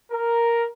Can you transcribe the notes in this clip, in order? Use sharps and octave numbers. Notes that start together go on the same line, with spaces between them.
A#4